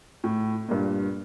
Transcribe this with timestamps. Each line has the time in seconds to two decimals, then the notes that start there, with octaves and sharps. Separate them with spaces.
0.24 A2
0.68 G2 A#2